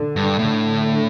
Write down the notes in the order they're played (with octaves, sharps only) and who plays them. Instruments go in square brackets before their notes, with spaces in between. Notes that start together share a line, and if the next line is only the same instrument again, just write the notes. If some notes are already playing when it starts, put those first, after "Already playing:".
Already playing: [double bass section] D3
[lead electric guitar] G2
[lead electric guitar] A2 [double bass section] D3